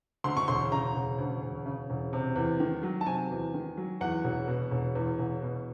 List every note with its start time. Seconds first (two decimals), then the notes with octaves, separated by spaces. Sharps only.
0.24 D2 C6
0.37 C#6
0.48 E1 C6
0.72 C#3 A#5
0.96 E1
1.18 D2
1.42 E1
1.66 C#3
1.90 E1
2.13 C3
2.36 E2
2.60 D#3
2.83 F#3
3.01 A5
3.06 C3 G#5
3.31 E2
3.54 D#3
3.77 F#3
4.01 E2 F#5
4.24 E1
4.48 B2
4.71 E1
4.95 E2
5.19 E1
5.42 B2